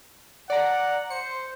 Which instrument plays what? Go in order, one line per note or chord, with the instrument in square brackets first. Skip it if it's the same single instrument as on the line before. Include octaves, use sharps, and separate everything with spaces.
[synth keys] D5 A#5 [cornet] F#5
[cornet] C5 [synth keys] C#7